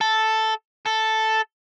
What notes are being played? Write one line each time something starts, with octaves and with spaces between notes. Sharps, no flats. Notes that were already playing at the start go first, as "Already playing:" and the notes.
A4
A4